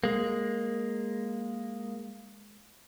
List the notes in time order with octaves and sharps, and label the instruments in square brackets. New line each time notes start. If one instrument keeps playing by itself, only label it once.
[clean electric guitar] G#3 A#3